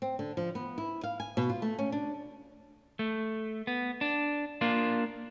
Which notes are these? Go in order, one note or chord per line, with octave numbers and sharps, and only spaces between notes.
C4
D3
F3
B3
E4
F5
G#5
B2
F4
A3
C#4
D4
A3
B3
D4
A#3 D4 F4